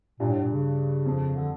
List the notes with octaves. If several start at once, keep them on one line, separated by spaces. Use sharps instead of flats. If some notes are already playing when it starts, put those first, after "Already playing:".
G2 A#2
A2
A#2
C#3
F2
D3